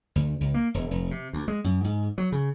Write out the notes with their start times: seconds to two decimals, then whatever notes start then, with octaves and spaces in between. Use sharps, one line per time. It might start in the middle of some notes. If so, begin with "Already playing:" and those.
0.16 D2
0.41 C#2
0.54 A#3
0.74 E1
0.91 F1
1.11 C3
1.33 D2
1.48 G#3
1.64 F#2
1.85 G#2
2.18 F#3
2.32 C#3